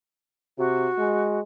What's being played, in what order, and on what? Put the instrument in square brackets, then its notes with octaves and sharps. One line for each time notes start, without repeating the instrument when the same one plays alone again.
[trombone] C3 [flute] F#4
[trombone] G#3